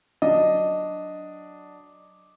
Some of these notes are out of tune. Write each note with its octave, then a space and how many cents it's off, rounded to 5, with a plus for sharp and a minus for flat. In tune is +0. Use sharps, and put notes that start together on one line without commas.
F#3 +0 D4 +0 D#5 +0